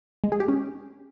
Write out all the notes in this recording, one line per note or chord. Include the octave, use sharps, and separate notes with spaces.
G#3
G#4
G4
C#4